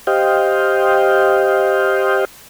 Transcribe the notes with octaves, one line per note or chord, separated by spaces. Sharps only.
G4 C5 D#5 F5 G5